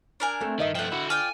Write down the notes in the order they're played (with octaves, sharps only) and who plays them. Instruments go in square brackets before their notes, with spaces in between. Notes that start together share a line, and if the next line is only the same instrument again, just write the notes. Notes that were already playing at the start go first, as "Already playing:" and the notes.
[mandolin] D4 A#4 G#5
[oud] A3 C4 A4
[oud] G2 D#5 E5 [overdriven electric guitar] D#3
[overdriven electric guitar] F3 A3 [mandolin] F#5 G5
[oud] D3 [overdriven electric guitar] E4 F#4
[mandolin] F4 D5 G5 [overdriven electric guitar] G#5